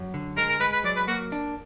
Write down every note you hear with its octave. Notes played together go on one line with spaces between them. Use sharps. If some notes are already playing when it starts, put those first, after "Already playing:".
Already playing: F#2
D3
G#3 A#4
A#4
G#3 B4
B4
F#3 D5
B4
A#3 F#4
D4